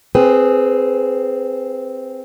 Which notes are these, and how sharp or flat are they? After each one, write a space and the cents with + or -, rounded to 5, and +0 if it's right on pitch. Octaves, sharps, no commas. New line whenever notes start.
C4 +0 G#4 +0 B4 +15